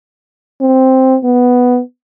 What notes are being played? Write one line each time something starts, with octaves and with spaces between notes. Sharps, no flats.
C4
B3